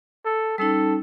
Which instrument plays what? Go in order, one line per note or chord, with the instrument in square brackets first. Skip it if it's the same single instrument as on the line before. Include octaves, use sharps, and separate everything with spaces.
[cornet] A4
[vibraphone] G3 C#4 D#4 [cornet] A4